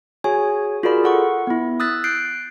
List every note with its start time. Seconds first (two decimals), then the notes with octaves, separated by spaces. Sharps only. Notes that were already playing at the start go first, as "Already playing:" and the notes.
0.24 F#4 G#4 C#5 G#5
0.83 F4 F#4 G#4 A#4 D5 B5
1.04 A4 F#5 C#6
1.47 B3 E4
1.80 D#6 E6 F#6 A6 B6
2.04 F#6 G6 C7 D7